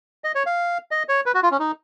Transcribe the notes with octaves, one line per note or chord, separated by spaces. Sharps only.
D#5
C#5
F5
D#5
C#5
B4
F#4
F4
C#4
D#4